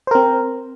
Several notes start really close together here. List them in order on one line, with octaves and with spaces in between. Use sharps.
C5 A#4 C4